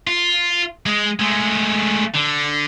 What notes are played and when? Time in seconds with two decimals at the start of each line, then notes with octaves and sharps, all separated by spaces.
0.07 F4
0.86 G#3
1.20 G#3 A3
2.14 D3